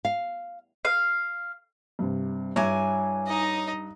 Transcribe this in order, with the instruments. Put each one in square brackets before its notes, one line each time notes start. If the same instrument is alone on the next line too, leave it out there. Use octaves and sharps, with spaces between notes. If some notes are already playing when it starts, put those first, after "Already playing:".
[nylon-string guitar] F5
[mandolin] F5
[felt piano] G2 C3
[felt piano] G2 [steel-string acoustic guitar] E4 G#5 [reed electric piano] C#5 A#5 D6
[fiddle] D#4 D#5